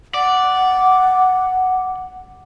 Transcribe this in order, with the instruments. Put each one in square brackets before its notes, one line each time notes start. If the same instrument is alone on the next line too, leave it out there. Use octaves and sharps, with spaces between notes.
[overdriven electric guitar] D5 [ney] F#5